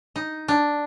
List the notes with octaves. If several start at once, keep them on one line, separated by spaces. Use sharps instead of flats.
D#4
D4